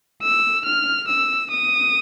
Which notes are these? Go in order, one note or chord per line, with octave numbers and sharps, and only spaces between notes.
E6
F6
E6
D#6